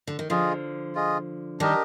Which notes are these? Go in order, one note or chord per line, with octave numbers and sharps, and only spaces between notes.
D3
D#3
D3 F3 F4 G#4 D#5
F4 G#4 D#5
D#3 G3 D4 G4 A#4 D#5